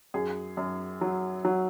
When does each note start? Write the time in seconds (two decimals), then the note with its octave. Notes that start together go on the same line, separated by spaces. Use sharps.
0.14 F#2 G#4
0.57 F#2
1.01 F#3
1.45 F#3